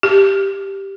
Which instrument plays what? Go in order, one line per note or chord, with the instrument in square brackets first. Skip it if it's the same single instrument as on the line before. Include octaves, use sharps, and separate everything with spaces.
[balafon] G4